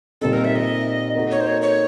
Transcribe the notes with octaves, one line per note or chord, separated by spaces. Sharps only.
A#2 G3 C4 D#4 A4
A#4
E5
D#5
A#3 D#4 F#4 A4
C#5
C5
C#5
C#5